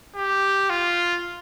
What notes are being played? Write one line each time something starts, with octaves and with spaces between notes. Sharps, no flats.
G4
F4